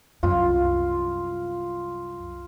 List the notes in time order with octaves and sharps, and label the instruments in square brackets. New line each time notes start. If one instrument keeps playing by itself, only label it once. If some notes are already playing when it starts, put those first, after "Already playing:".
[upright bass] C2 F#2 [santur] F4